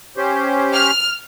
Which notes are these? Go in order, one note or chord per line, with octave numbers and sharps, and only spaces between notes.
C#4 G4 C5
F6